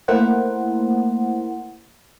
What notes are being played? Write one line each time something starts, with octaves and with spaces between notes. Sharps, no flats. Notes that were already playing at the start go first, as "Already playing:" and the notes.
A3 A#3 E4 A#4 C5 F#5